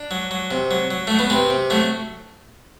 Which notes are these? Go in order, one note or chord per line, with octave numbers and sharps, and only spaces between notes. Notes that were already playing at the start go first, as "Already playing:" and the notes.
Already playing: D4
F#3
F#3
C3
F#3
F#3
F#3 A3
B3
C3 C4
C3
F#3 A3